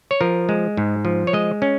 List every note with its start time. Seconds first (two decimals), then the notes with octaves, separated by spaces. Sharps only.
0.11 C#5
0.21 F3 A#4
0.49 G#3
0.77 G#2
1.05 F3
1.27 C#5
1.33 G#3 D#5
1.62 C#4